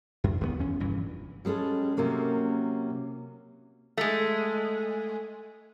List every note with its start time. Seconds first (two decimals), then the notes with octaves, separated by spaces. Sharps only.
0.24 F#2
0.41 D#2 G#3 B3
0.59 E2 C#4
0.80 F1 G2 A#2 E3
1.45 G3 G#3 C4 C#4 A4
1.97 C3 F#3 A#3 C#4
3.97 G#3 A3